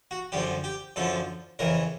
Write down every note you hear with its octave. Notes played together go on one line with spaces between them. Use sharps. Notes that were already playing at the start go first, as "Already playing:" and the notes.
F#4
F#2 D3 F3 G4
G4
F#2 D3 F3 A4
F2 C#3 E3 A#4